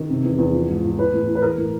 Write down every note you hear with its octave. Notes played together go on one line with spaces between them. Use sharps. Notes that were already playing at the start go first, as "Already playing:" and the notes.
Already playing: D#3
C3
E2
E2
F3
G#2
F3
E3 B4
A2
E3
B4
E3 A#4
A2